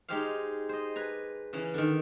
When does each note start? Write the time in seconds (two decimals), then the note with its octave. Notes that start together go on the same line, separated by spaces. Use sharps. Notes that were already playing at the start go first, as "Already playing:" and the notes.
0.09 G#3 D#4 G4 G#4 C5 F5
0.69 C5 D#5
0.96 B4 G#5 A#5
1.53 C#3 E3 C#4
1.74 D3 D#3